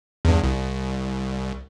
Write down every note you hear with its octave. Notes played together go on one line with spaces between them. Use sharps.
E2 G2
C2